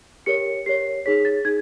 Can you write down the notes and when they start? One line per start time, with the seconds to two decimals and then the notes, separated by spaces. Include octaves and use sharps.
0.26 G4 A#4 C#5 C#7
0.66 G4 A#4 C#5 C7
1.06 D#4 G#4 C#5 B6
1.25 A6
1.45 D#4 G#4 G#6